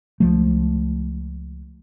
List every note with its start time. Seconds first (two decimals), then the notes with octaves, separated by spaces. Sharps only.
0.20 C#2 F3 A3